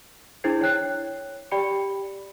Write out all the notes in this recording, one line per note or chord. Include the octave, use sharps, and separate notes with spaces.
D4 E4 G#4 C5 G#6 C7
C#5 G5 F#6 C7
G4 D5 G5 B5 C#7